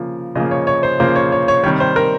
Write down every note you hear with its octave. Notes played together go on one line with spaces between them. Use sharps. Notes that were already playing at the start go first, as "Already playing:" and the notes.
Already playing: C#3 F3 A#3
C#3 F3 A#3 D#5
C#5
C#5
C5
C#3 F3 A#3 C5
C#5
C#5
C#5
C3 D#3 G3 C#5
C5
A#4